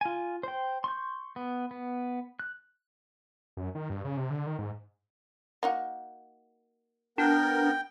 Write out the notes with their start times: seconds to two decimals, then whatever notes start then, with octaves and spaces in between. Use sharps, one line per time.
0.01 F4 G#5
0.43 C5 G5
0.84 C6 C#6 G6
1.36 B3
1.71 B3
2.39 F#6
3.57 F#2
3.75 D#3
3.90 G2
4.04 C#3
4.17 C3
4.30 D3
4.46 D#3
4.59 G#2
5.63 A#3 D#4 F#4
7.18 B3 D4 A#4 G5